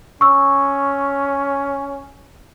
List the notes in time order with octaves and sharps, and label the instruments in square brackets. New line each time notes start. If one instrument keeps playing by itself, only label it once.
[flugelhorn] C#4 [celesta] C#6 E6